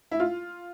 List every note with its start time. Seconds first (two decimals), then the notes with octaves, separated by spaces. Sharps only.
0.11 E4
0.20 F4